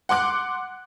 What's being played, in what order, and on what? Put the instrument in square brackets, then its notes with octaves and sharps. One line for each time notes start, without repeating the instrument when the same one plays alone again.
[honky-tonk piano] F#5 C6 D6 F#6